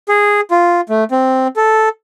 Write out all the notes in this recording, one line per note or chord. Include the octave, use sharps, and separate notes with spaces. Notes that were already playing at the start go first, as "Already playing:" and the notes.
G#4
F4
A3
C4
A4